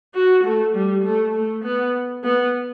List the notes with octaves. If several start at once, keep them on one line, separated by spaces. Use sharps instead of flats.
F#4
A3
G3
A3
A3
B3
B3